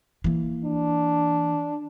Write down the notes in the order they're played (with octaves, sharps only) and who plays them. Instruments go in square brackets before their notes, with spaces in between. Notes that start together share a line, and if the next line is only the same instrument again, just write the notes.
[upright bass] E3 A#3
[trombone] D4